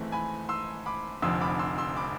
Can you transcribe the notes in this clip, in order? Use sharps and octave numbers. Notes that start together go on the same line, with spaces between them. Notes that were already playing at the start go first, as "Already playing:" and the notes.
Already playing: G#1 G#2 E3 A3 C4
G#5 B5
C6 E6
B5 D6
F1 F2 D3 F3 C6 E6
B5 D6
C6 E6
C6 E6
B5 D6